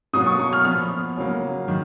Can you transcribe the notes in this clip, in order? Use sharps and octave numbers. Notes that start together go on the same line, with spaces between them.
B2 F#3 A#3 D#6
C#6
C#6
F6
A#2 F3 B3 F6
C#3 F#3 A#3
D#3